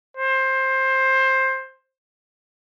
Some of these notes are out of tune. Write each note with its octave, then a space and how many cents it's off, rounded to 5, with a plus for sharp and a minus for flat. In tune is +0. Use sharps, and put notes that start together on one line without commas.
C5 +15